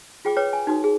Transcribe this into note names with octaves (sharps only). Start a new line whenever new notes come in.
F4 G#4 G5 B5 D6
B4 C#5 G5 D6
G#5
D#4 F#4 D#6
G#4